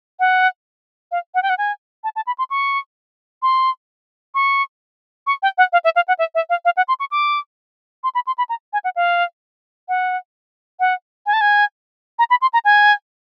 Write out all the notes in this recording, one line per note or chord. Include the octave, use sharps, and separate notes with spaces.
F#5
F5
F#5
G5
F#5
G#5
A5
A5
B5
C6
C#6
C6
C#6
C#6
G5
F#5
F5
E5
F5
F#5
E5
E5
F5
F5
F#5
C6
C#6
D6
C6
B5
C6
B5
A#5
G#5
F#5
F5
F#5
F#5
G#5
A5
G#5
A#5
B5
C6
A#5
G#5